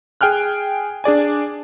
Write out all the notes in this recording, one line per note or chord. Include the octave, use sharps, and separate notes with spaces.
G#4 G5 G#5 F6 F#6
D4 G#4 D5 G#5